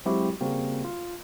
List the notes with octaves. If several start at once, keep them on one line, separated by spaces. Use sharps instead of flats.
F#3 G#3 C4 E4 F#4 G4
C#3 G3 A#3 C4 F#4
F4